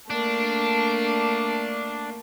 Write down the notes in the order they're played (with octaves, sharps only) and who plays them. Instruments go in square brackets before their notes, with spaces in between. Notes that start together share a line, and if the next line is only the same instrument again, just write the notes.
[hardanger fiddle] A3 A#3 [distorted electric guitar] D4